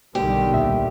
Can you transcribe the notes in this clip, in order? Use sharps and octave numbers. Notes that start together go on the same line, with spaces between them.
B1 D3 D#3 G3 G4
D2 A#2 E5